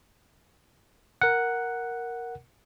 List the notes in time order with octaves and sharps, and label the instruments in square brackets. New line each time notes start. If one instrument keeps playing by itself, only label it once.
[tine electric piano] A#4 F#5